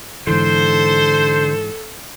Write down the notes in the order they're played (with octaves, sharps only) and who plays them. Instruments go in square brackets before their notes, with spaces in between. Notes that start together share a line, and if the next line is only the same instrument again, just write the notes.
[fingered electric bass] G#2 E3 [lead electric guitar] D3 [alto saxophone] A4 [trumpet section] C5